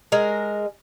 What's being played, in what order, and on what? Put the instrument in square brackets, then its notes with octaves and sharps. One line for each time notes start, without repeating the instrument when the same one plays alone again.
[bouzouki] G#3 A#4